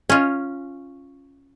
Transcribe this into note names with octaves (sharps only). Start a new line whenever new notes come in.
C#4 F4